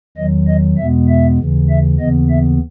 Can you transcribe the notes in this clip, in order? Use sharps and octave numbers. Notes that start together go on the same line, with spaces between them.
E2 D#3 F#3 D#5
D#5
E2 B2 G#3 B3 E5
E5
D#2 C#3 E3
E5
D#2 C#3 E3 B3 D#5
E5